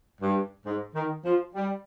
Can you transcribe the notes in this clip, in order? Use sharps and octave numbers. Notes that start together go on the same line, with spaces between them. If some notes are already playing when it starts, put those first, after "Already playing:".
G2
G#2
D#3
F3
G3